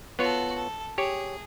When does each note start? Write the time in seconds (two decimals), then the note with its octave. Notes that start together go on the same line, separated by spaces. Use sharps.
0.19 B3 F4 F#4 A4 C#5
0.56 A4
0.98 G4 G#4 C#5